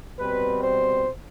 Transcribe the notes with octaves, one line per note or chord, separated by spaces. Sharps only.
B2 G3 C4 B4
C5